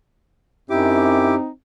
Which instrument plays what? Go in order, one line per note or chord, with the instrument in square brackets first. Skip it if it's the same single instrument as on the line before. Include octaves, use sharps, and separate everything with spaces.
[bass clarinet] F#2 [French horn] C4 [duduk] D#4 [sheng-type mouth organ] E4 G4 D6